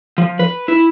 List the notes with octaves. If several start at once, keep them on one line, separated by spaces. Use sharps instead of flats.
F3
B4
E4